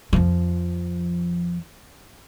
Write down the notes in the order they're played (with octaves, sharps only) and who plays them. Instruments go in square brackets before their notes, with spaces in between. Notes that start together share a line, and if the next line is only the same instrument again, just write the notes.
[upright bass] F2 F3